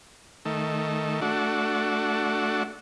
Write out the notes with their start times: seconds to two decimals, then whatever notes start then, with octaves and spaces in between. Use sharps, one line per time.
0.45 D#3 A3
1.22 A3 D4 F#4